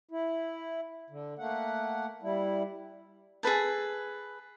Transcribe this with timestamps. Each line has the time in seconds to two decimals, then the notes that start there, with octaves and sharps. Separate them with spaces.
0.11 E4
1.10 D3
1.39 A3 A#3 F#5
2.22 G3 E4
3.43 G#4 A4 B4 A5